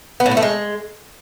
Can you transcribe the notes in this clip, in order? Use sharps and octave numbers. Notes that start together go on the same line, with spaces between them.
B3
A2
B3
A3
G#3